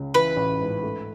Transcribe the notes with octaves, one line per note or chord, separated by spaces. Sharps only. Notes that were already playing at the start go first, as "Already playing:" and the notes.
Already playing: C#2 C#3
E3 B4
A1
G#2
A3